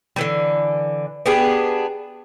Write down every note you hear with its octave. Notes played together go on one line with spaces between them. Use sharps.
D3 E3 G3
B3 D4 G4 G#4